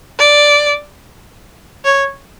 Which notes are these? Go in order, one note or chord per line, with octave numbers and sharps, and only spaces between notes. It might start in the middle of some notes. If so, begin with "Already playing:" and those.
D5
C#5